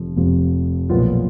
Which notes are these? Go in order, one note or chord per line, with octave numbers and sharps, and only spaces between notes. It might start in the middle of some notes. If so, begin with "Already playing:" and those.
Already playing: F1 F2 F3
F1 F2 F3
B1 A#2 F3 B3 F4